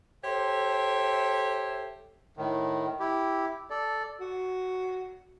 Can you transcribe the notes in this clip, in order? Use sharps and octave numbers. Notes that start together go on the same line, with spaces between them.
G4 A4 C5 C#5 E5
A2 D#3
E4 G4
A4 D5
F#4